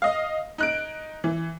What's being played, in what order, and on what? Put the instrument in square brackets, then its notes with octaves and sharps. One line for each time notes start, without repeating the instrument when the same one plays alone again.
[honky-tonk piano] D#5 F5
D#4 F#6 D7
E3